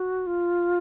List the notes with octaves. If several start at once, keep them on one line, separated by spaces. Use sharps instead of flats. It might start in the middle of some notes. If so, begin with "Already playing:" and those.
Already playing: F#4
F4